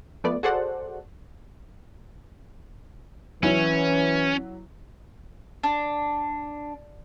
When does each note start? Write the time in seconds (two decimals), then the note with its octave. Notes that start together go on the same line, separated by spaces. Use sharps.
0.24 F3 A3 B3 D5
0.43 F#4 G#4 A4 C5 D5 F#5
3.43 E3 F#3 C#4 E4
5.63 D4